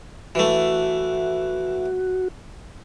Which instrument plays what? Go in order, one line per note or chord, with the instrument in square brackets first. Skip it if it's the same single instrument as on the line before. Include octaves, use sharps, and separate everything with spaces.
[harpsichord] E3 A3 [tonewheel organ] F#4